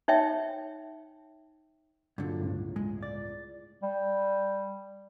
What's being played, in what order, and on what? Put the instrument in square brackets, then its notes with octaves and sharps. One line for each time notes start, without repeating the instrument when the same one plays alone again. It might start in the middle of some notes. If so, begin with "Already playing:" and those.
[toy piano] D#4 C#5 E5 G5
[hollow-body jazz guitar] G2 D3 [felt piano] A#2 F#3
[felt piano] G1 C#2 A2
[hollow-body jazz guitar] G#3
D5
[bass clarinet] G3